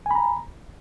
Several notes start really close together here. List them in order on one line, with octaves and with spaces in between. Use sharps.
G#5 B5 A#5